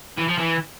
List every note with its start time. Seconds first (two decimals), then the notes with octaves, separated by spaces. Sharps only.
0.17 E3
0.28 F3
0.38 E3